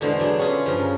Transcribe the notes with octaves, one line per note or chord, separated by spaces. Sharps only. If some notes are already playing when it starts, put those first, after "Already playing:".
E2 B2 D3 G#3 C5 B5
F#3 D4 G#4
C#4 F4 G#4 B4
B5
G2 C#3 F3
C#4 A#4